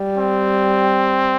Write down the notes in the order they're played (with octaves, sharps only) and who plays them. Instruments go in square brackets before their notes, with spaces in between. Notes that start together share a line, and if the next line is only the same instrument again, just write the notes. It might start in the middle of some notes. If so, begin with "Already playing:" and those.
Already playing: [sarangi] G3
[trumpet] C4